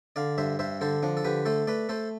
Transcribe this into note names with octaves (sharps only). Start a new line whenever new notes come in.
D3 D5 F5
G2 C5 E5
G2 C5 E5
D3 A4 C5
F3 D4
A4
D3 G4 B4
A3 A4 C5
A3 B4 D5
A3 A4 C5